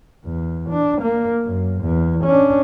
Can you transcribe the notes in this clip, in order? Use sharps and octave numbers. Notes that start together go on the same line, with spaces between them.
E2
D4
A#3
F#2
E2
C#4 D4